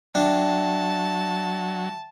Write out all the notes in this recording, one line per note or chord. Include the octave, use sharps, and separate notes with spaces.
F#3 D4 E5 G5 A5